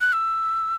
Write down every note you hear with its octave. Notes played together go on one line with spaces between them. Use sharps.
F#6
E6